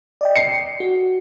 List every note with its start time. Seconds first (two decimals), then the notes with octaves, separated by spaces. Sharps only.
0.21 D5 D#5 G5
0.36 C7 C#7
0.80 F#4